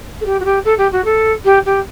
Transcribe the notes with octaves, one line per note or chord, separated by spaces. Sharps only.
A4
G4
F#4
G4
A4
G4
F#4
A4
G4
G4